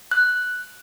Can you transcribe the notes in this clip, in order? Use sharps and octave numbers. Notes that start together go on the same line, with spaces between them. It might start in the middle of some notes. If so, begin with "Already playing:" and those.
F#6